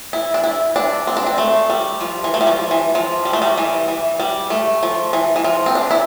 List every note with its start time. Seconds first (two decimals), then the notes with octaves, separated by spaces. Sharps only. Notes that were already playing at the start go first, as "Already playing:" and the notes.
0.13 E4
0.34 D4
0.44 E4
0.76 D4
1.07 C4
1.17 D4
1.26 C4
1.38 A3
1.70 G3
2.01 F3
2.24 E3
2.34 A3
2.41 G3
2.47 F3
2.71 E3
2.95 F3
3.25 G3
3.33 A3
3.42 G3
3.57 E3
3.88 E3
4.20 G3
4.50 A3
4.83 F3
5.13 E3
5.36 E3
5.44 F3
5.66 C4
5.75 D4
5.91 E4